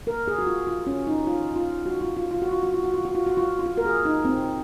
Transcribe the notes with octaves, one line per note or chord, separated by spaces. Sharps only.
A#4
G#4
F#4
F4
F4
C#4
D#4
F4
F4
F#4
F4
F4
F4
F#4
F4
F#4
F4
F#4
F4
F#4
F4
F#4
F4
F4
F#4
A#4
G#4
D#4
C4